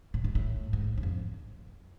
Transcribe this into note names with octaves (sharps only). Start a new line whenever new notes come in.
A2
G#2
A2
G#2
E2
F2